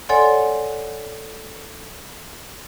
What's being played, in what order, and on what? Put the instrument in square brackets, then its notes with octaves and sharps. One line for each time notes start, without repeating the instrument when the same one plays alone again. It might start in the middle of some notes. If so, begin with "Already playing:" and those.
[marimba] A4 C#5 D5 F#5 G#5 C6